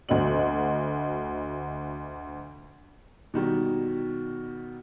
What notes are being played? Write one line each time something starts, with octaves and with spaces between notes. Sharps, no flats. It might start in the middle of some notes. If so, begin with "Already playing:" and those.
D2 F#4 D#5 F#7
B2 D#3 G3